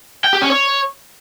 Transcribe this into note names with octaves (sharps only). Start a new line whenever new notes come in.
G5
G4
C#4
C#5